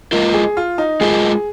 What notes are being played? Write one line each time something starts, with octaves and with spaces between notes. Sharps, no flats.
G#3 A#3 F4 A#4 D#5
G#4
F4
D#4
G#3 F4 G#4 A#4 D#5